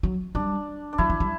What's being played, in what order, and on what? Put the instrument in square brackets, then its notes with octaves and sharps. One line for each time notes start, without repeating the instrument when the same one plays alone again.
[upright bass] F#3
[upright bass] G3 [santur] D4
[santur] D4
[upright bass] F#3 [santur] E4
[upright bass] E3
G3